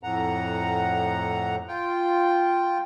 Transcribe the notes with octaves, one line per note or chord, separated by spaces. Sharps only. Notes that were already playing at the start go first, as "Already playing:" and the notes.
F2 A2 F#5 A#5
F4 G5